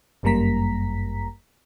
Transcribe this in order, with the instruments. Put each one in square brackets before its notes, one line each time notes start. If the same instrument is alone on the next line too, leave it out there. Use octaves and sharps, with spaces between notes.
[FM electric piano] G1 F#2 G3 A#3 A#5 B6